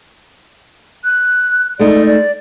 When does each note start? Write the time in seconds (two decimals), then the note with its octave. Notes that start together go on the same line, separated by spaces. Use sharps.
1.04 F#6
1.79 G#3 A3 D#4 D5
2.06 D5